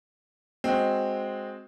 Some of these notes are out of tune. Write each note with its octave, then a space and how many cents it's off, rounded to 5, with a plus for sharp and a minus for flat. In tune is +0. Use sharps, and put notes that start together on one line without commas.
G#3 +0 C4 +0 F#4 -5